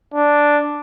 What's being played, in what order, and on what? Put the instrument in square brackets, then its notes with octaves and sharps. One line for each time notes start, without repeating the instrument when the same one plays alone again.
[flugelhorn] D4